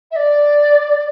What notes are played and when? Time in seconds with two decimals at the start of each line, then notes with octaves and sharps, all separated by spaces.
0.11 E5
0.16 D5